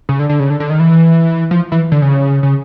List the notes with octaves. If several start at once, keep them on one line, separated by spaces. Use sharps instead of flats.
C#3
D3
D3
C#3
D3
D3
D#3
E3
F3
E3
D3
C#3
C#3